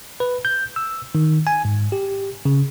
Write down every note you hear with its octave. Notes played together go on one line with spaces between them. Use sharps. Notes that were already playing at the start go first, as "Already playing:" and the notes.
B4
G6
E6
D#3
G#5
G#2
G4
C#3